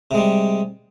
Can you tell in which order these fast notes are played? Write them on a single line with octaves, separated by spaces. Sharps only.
C3 G#3 G3